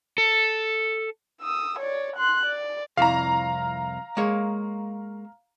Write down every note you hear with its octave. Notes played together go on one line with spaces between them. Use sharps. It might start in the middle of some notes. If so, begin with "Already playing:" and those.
A4
D#6 E6
C#5 D5
C6 F#6
D5
C2 F2 E4 F5 A#5
G#3 A#3 C#5